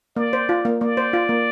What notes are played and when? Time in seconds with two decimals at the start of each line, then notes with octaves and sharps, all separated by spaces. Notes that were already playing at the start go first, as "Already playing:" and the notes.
0.16 A#3 D5
0.33 C5
0.49 F4
0.65 A#3
0.81 A#3 D5
0.97 C5
1.13 F4
1.29 A#3